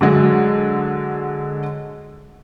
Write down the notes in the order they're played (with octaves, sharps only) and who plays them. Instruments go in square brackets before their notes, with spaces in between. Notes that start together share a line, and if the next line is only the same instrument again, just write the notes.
[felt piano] D3 F#3 G#3 G#4